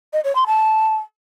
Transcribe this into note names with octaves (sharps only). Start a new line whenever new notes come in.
D#5
C#5
C6
A5